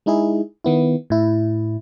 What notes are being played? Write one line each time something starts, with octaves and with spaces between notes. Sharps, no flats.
G#3 D#4 E4 G#4
D#3 B3 E4
A2 E4